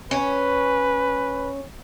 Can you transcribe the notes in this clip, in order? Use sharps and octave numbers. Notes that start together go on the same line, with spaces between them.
C#4 B4